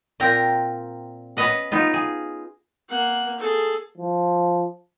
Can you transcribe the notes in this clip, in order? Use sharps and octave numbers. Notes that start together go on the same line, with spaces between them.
A#2 C4 A#4 G5 A#5
B3 C#4 B4 D#5 F#5
B3 D#4 F4
G#4
A#3 F#5
G#4 A4
F3